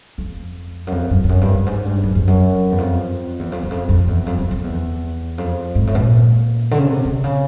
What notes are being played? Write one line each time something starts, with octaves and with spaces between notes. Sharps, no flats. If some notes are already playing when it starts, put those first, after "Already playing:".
F2
F#2
F2
F#2
F2
F#2
G2
G2
G#2
G2
F#2
F2
F#2
E2
F2
E2
F2
E2
F2
F2
E2
F2
F2
F2
E2
F2
G#2
A2
B2
A#2
D3
C#3
C3
C3
C#3